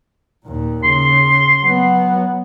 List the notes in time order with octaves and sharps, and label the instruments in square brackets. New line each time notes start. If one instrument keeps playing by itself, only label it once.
[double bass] D#2 A#2
[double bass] C#3 [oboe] C6
[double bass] F#3 B3